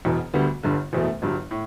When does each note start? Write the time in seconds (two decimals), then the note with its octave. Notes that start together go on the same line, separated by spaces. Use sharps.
0.05 E1 E2 B2
0.34 D2 D3 G3 B3
0.63 G1 G2 D3
0.93 F#1 E2 B2 A3
1.22 G1 G2 F#3
1.51 A2